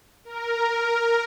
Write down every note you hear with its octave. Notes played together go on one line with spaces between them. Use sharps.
A#4